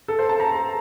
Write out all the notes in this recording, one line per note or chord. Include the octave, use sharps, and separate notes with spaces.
A4
C5
A5
A#5